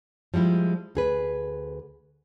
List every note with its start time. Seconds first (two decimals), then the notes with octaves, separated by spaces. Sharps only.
0.34 F3 G3 G#3 E4
0.95 D2 G#4 B4